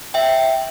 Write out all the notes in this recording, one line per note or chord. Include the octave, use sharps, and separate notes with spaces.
E5 G5